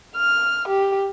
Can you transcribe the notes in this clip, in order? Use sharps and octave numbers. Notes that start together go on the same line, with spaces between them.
F6
G4